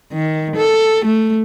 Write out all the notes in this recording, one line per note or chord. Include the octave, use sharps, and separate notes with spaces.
D#3
A4
A3